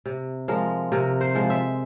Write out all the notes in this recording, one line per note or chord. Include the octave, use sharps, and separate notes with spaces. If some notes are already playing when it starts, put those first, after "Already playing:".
C3
F3 G#3 A#4
C3 A#4
C5
F3 G#3
E5